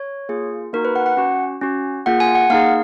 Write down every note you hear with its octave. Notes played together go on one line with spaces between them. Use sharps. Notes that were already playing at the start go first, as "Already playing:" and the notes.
Already playing: C#5
A#3 F4 G#4
A#3 D#4 F#4 A#4
B4
F#5
F#5
C#4 F#4
C#4 F#4
A#3 F4 G#4 F#5
G#5
F#5
A#3 D#4 G#4 F5